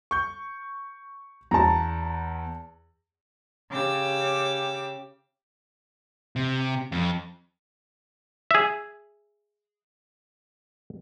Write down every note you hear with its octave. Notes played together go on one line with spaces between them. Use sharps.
C#6 G6
E2 A5 A#5
C#3 G4 D6 E6
C3
F2
G#4 E5